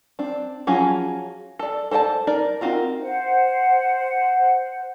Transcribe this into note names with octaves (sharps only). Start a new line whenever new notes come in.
C4 D4
F3 F#3 C#4 F4 G#4
A4 D5
A4 C5 D5 G5 A5
D#4 A#4 D5
C4 D#4 F4 F#4 A#4
C5 F#5